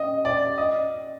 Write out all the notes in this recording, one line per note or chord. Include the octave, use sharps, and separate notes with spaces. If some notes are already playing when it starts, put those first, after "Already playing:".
Already playing: D#5
D5
D#5